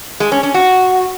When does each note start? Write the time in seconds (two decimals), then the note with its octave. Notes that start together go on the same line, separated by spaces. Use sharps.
0.20 G#3
0.32 C#4
0.43 C#4
0.54 F#4